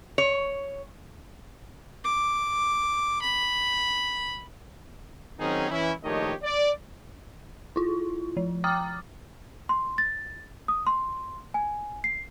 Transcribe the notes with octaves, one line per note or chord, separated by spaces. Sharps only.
C#5
D6
B5
D#3 F#3 C4 C#4 D#4 G#4
E3 C#4 E4
A#1 D#3 A3 G4 C#5 D#5
D5
E4 F4
F3
G5 A#5 D6 D#6 F6 A6
C6
A6
D#6
C6
G#5
C7